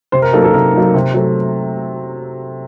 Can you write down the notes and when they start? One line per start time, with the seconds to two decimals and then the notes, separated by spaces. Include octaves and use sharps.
0.12 C3 C5
0.22 A#4
0.33 F#3 A#3 D#4 A4
0.44 A4
0.53 C3 A#4
0.74 F#3 A#3 D#4
0.94 C3
1.14 F#3 A3